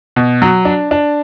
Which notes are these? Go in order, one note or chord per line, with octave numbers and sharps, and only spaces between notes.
B2
F#3
D4
D4